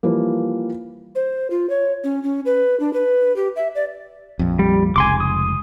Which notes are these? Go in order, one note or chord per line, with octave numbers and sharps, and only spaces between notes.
E3 F3 G3 A#3
C5
F4
C#5
C#4
C#4
B4
D4
B4
G4
E5
D5
A#1 F2
G3
F1 C#2 G#5 C6 D6
D#6